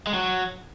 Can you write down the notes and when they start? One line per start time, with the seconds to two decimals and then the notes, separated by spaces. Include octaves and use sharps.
0.07 G#3
0.14 F#3